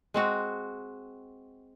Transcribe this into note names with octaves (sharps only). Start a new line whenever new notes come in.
G#3 C4 F#4